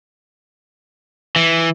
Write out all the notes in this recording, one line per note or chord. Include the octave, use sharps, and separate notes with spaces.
E3